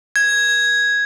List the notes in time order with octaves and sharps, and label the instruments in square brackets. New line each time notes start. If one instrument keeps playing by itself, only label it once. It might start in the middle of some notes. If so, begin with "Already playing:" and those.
[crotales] G#6